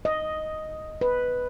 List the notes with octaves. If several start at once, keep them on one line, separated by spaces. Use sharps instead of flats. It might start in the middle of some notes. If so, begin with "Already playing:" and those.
D#5
B4